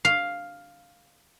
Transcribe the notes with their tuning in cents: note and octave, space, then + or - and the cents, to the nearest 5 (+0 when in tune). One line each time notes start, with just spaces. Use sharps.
F5 +5